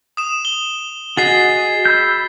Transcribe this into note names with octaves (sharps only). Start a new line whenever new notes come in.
D#6 E7
G7
F#4 G#4 D#5 A6 C7
B5 E6 G6